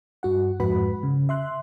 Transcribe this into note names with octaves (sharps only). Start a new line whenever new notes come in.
G2 F#4 F#5
F2 G#2 F#4 B4 F#5 B5
C#3
E5 C6 F#6